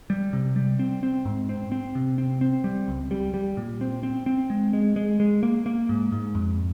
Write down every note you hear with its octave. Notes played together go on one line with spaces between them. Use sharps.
G3
C3
G3
C4
C4
G#2
C4
C4
C3
C4
C4
G3
C#2
G3
G3
A#2
C4
C4
C4
G#3
G#3
G#3
G#3
A#3
A#3
G#2
G#2
F2